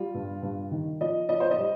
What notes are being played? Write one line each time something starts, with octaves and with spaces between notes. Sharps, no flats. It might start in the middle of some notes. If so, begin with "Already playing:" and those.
Already playing: G3 F4
G2
G2
D#3
F3 D#5
F3 D#5
C5
D#5
G3